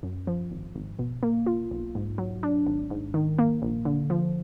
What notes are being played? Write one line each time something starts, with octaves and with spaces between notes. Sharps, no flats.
F#2
F3
G#1
G#1
B2
A#3
F4
B1
G#2
F#3
D4
G#1
G#2
D#3
A#3
A#1
D3
F3